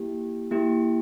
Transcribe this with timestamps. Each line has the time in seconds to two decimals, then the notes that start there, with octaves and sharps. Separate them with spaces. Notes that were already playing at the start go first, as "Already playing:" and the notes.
Already playing: A#3 E4 G4
0.51 A#3 E4 G4